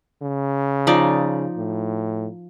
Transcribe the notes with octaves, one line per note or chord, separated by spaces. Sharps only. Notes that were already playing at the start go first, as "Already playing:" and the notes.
C#3
F3 D#4 D5
A2